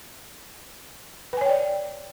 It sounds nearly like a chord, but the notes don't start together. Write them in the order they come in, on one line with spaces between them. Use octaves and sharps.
B4 G#5 C#5 G5 D5